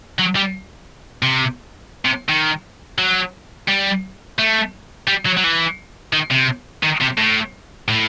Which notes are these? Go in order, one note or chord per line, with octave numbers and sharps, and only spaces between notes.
F#3
G3
C3
C3
D#3
F#3
G3
A3
G3
F#3
F#3
E3
D#3
C3
D#3
C3
A2
A2